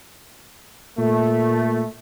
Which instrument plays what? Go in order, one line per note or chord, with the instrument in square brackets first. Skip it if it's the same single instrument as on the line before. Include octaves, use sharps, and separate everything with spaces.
[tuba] A#2 [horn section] A3